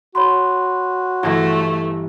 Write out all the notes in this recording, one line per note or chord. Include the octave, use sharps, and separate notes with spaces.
F#4 C#5 B5 C6
G1 E3 A3 A#6